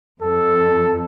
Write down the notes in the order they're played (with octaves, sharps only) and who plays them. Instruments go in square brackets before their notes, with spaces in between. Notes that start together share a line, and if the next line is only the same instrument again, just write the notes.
[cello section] F2 [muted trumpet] A4